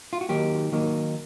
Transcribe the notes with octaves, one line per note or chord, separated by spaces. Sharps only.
F4
F#4
D#3 F#3 A#3 D#4 G4
D#3 F#3 A#3 D#4